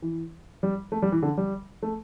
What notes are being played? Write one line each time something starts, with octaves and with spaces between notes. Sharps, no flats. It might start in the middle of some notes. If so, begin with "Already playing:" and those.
E3
G3
A3
G3
E3
D3
G3
A3